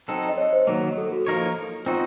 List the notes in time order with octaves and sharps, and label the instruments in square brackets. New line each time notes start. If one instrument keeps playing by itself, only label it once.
[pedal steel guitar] F#3 C4 D#4 A4
[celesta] D#5
C#5
C5
[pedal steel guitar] D#3 F#3 A#3
[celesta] A4
F#4
[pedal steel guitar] F3 A#3 D#4 A#4 C#5
[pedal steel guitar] C4 D#4 F#4 C5 [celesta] F4